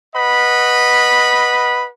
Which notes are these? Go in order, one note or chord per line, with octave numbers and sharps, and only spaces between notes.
B4 D#5 F#5 B5